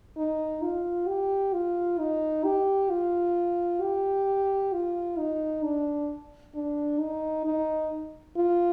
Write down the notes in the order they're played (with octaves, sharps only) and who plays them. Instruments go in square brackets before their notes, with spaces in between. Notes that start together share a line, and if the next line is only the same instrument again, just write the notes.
[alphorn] D#4
F4
G4
F4
D#4
G4
F4
G4
F4
D#4
D4
D4
D#4
D#4
F4